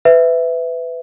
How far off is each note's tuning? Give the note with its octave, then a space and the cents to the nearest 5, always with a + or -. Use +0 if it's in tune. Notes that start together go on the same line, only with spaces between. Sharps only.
B4 +25 E5 +0